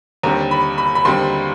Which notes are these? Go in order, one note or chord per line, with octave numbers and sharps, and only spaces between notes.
D#2 D3 G3 C4 A#5
B5
B5
B5
D#2 D3 G3 C4 C6